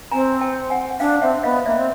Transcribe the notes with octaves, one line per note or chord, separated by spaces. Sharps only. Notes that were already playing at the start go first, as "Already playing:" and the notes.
C4 G#5 A#5
G5 A5
F#5 G#5
F#5
D4 F5 G5
C4 E5 F#5
B3 D#5 F5
A#3 D5 E5
C4